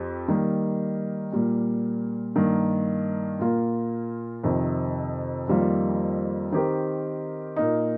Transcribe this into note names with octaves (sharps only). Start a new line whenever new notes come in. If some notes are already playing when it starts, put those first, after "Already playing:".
Already playing: F2 C4 G4
D#3 G3 A#3
A#2 G3 A#3
G2 D#3 A#3
A#2 A#3 F4
F2 C3 D#3
F2 D#3 G3 A#3 F4
D#3 C4 G4 A#4
A#2 A#3 D#4